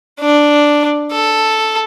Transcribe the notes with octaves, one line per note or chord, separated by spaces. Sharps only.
D4
A4